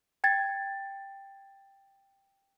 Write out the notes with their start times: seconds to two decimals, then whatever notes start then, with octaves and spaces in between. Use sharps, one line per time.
0.24 G5 G#6 A6